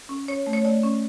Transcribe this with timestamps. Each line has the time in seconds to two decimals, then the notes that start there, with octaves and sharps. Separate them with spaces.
0.09 C#4
0.28 C#4 C#5
0.46 A3
0.53 C#5
0.65 A3 D5
0.83 C#4